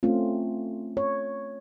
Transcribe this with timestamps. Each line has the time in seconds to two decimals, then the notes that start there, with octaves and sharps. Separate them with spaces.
0.03 A3 C4 C#4 F4
0.97 C#5